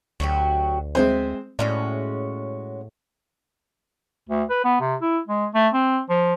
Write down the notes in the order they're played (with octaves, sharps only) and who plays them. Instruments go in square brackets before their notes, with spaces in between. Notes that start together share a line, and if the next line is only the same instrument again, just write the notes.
[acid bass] D2 [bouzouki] F#3 F#4 G4
[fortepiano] G#3 C4 C5 [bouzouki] E5 F#5 G#5
[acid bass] A2 [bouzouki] G#3 C#4 F#4 [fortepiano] D5
[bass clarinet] D2
B4
B3
C3
E4
G#3
A3
C4
F3